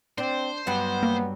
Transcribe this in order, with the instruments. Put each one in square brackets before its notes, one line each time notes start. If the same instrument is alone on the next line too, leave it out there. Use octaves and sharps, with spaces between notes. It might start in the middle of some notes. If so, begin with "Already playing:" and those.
[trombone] C4 [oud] D4 [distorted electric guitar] C5
[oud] G2 F#3 G3 [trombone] B3
[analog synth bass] A#3